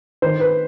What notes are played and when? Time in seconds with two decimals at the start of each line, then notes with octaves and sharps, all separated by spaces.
0.22 D#3 C5
0.40 B4